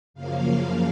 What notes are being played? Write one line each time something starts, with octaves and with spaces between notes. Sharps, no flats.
F#2 C#3 F3 A#3 F5